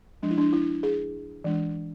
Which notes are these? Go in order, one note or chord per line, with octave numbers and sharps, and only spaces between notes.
F3 G#3 D4
E4
D4
E4
G#4
E3 G#3 D4